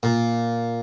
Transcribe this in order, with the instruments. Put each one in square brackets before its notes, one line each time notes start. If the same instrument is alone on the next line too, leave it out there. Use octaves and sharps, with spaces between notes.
[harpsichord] A#2